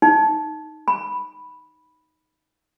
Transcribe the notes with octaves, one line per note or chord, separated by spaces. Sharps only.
D#4
B5